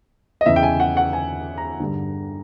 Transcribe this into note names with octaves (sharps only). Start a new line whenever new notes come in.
D#5
E2 C#3 E3 E5
G5
G#5
F#5
F#5
G#5
A#5
G2 D3